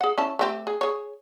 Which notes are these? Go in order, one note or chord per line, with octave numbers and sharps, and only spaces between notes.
G#4 F#5
C#4 E4 A5
A3 C4 G4
G#4
G#4 C#5